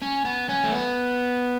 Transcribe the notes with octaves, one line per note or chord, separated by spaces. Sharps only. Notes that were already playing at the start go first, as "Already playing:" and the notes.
C#4
B3
C#4
A3
B3